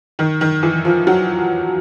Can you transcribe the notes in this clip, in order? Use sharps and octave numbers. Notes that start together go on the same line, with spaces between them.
D#3
D#3
E3
F3
F#3